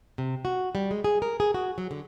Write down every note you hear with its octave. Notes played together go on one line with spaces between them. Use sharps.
C3
F#4
G3
G#3
G#4
A#4
G#4
F#4
F#3
D3